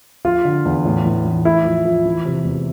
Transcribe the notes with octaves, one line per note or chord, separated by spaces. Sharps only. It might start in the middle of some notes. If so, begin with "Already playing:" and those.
F3 F4
D3
E2
A2
E3
E3
A2 E4
F3
F3
E3
C3
E2